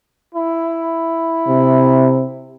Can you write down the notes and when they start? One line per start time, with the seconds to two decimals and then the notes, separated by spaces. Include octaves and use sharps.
0.35 E4
1.48 C3